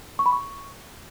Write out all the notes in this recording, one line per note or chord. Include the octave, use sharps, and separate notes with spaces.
C#6
B5
C#6